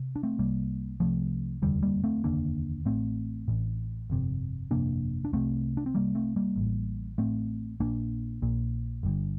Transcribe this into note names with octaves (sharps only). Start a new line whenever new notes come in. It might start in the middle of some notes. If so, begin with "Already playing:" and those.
Already playing: C3
D4
A3 C4
C2 C3 G3 A#3
C2 C3 F3 A3
F1 D#2 D3 G3
G3 A#3
A3 C4
F1 D#2 D3 A#3 D4
A1 A2 A3 C4
A1 A2
G1 F2 C3
G1 F2 C3 A#3 D4
D4
C2 C3 A3 C4
D4
C4
C2 C3 G3 A#3
A3 C4
G3 A#3
A1 A2
A1 A2 A3 C4
A#1 A#2 A#3 D4
A#1 A#2
G1 G2 D3